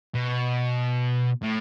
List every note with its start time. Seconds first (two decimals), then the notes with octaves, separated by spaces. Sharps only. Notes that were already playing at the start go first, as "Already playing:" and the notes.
0.15 B2
1.43 A2